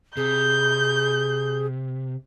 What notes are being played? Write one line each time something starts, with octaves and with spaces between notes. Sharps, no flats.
C3 G#4 G6